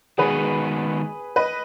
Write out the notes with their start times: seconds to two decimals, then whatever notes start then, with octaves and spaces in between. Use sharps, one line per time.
0.18 D#3 G#3 B3 F#4 G#4 B4
1.36 B4 D#5